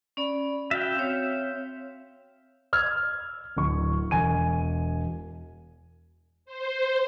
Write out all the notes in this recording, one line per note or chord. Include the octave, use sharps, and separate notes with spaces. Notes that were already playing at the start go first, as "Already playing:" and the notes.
C#4 D5 B5
F#4 E5 F5 G5
C4 C#5
E6 F6 G#6
D1 C#6
E1 G#5 D#7
C5